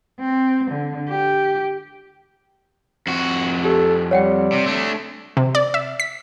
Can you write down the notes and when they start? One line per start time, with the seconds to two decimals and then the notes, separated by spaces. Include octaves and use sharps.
0.20 C4
0.71 D3
1.09 G4
3.07 F2 F#4
3.64 G4 A4
4.11 G3 C#5 F#5 G5
4.52 C3
4.66 A3 D4
5.37 C3
5.55 D5
5.74 E5
6.00 B6